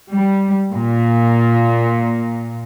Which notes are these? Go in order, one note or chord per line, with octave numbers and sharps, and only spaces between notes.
G3
A#2